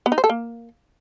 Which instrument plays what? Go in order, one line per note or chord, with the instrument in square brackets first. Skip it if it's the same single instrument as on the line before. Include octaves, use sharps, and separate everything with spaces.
[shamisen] B3
D#4
C5
A4
A#3